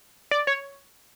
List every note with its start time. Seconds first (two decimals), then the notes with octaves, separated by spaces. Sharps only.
0.31 D5
0.47 C#5